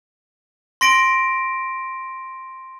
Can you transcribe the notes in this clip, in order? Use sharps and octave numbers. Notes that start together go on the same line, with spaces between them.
C6 A#6 D7